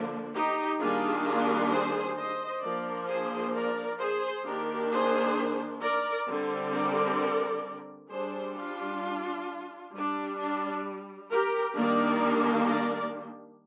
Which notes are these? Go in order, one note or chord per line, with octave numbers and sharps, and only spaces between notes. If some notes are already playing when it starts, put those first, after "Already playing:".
Already playing: D3 F3 A#3 D4
D#4 G4
D#3 G3 A#3 D4 F4 G#4
F4 G#4
G#4 C5
C5 D#5
F3 A#3 D4 A#4 D5
G#4 C5
A#4 D5
G#4 C5
D#3 A#3 D4 G4 A#4
G#4 C5
A#4 D5
D3 G3 C4
A#4 D5
G3 D4 G#4 C5
D4 F4
G3 D4
D4
G4 A#4
D#3 G3 A#3 D4 A#4 D5
A#4 D5